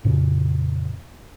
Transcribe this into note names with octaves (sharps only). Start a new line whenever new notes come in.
F2 A#2 C#3 C#4